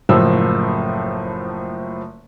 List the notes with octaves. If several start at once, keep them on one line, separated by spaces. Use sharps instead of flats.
F#1 A2 F3 E6